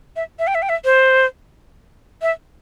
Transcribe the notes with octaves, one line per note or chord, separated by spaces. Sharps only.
E5
E5
G5
E5
G5
E5
C5
E5